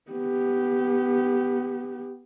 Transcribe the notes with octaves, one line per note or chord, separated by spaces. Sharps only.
B3 G4